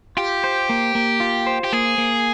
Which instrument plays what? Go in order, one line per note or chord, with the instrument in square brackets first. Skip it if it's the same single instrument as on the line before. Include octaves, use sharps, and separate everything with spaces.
[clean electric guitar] F4 [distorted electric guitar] G4
[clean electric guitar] C5
A#3
A#3
F4
C5
[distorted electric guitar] G4
[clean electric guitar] A#3 [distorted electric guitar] G#4
[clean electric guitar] A#3